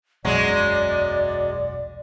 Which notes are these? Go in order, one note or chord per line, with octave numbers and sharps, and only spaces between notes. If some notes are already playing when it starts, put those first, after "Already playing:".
E1 B1 F#2 F#3 G#3 D5